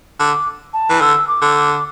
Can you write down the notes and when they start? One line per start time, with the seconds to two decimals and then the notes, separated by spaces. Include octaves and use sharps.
0.19 D3 D6
0.73 A5
0.90 E3
1.01 D3 E6
1.28 D6
1.42 D3
1.55 D6